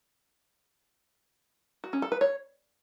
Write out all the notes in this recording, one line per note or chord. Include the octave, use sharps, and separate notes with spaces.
F#4
C#4
A4
B4
C#5